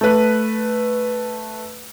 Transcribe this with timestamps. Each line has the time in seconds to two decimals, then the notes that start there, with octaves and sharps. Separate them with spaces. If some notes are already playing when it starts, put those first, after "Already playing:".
0.01 A3 B4